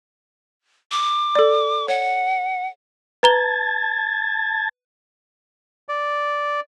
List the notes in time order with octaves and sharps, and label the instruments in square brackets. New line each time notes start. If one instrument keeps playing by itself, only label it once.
[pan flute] D6
[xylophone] A4 D5
[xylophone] C#5 [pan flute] F#5
[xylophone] B4 A#5 G7 [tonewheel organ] A5 G#6 A6
[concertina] D5